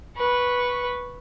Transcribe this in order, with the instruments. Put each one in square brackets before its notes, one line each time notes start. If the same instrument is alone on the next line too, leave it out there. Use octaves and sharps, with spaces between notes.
[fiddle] B4 C#6